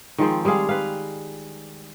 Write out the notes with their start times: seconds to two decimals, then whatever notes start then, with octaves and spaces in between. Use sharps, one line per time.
0.18 D#3 F3 G#3 C4
0.45 G3 G#3 G#4 F5
0.69 B4 F5